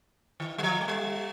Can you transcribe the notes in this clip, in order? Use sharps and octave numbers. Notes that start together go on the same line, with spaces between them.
D#3
G3
F3
G#3
G3